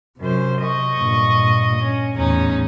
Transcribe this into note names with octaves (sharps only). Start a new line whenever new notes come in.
F#2 C3 C5
D#5 C#6
G2 A#2
C#4
E2 A2 C#4 D#4